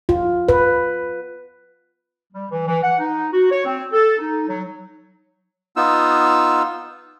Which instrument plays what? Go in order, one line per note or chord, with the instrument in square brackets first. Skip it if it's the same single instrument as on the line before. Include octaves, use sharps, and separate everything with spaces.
[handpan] F4
B4
[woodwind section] G3
E3
E3
F#5
D#4
F#4
C#5
C4
A4
D#4
F#3
[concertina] B3 D#4 F4 E6